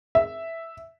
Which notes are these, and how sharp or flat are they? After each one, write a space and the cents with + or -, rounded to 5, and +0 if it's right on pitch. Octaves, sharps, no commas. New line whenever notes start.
E5 +0